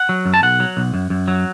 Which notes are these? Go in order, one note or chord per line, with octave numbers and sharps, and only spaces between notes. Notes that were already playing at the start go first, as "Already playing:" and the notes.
Already playing: F#5
F#3
F#2
A5
B1 F#5
F#3
B1
F#2
F#2
F#3